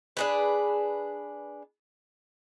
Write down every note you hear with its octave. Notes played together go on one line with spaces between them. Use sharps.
D4 G#4 B4